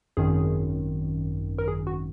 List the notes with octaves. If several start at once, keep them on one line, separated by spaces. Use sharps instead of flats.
G#1 F#2 D#3 G#4
A#4
G#4
F#4